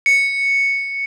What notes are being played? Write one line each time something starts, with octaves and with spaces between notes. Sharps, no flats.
C#7